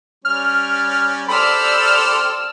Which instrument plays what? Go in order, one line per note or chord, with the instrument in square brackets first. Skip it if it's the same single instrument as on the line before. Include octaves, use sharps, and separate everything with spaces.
[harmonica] G3 C#4 [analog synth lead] F6
[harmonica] G4 A4 C5 [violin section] D5 E6 F6 [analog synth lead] B5